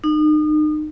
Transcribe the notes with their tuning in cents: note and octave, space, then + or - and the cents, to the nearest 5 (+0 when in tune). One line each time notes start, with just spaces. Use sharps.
D#4 -35